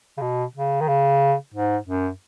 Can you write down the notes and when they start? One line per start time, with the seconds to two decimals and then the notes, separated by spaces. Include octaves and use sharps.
0.18 C#3
0.21 B2
0.55 C#3
0.81 D#3
0.88 C#3
1.54 G#2
1.87 F#2